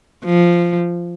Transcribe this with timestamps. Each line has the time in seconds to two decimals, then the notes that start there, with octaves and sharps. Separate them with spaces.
0.25 F3